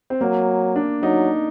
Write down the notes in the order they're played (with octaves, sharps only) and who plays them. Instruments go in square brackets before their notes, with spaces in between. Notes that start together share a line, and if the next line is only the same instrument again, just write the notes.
[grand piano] C4
[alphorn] F#3 [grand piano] A#3
[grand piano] D4
[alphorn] F#3 [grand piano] D#4